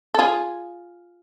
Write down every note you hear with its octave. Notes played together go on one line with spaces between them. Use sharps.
A4
F4 G#4